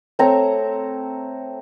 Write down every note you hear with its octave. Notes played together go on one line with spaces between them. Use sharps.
A3 C4 C#5 A#5